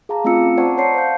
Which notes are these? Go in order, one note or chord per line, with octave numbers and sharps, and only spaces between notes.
G#4 F5 A5 A#5
A3 C4 C#4 F4 E6 C#7
C#4
C5 D5 F#5 A5 A#5 C#6
C#5 F#5 A5 C6 C7 C#7
C5 F5 G6